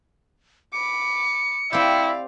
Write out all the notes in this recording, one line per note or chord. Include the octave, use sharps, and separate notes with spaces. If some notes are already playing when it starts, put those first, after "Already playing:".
B5 D6 C#7
C4 E4 G4 D5 F5